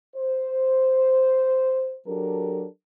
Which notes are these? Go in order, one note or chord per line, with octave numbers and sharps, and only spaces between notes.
C5
F#3 D4 G4 A4 A#4